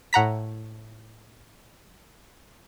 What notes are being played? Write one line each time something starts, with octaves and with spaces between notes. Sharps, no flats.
A2 F#5 A#5 B6